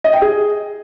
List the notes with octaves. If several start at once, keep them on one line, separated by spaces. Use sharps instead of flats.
D#5
G5
G#4